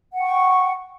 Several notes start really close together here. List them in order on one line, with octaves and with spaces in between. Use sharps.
F#5 G5 C#6